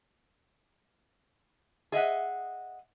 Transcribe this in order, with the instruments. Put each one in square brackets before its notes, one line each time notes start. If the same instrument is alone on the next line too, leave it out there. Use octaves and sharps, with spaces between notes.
[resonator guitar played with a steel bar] G#4 D#5 E5 F#5